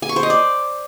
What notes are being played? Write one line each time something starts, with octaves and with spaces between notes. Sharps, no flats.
G#5
C#6
C5
D#5
D5